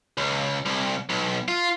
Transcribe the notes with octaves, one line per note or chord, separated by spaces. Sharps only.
C#2
C2
B1
F4